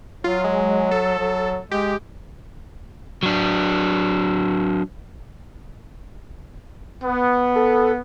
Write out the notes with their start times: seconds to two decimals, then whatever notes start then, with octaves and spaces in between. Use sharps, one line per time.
0.24 F#3 F4
0.44 G#3
0.91 A4
1.19 F#3
1.71 G#3 G4
3.23 F#3 D4
7.04 B3
7.55 A4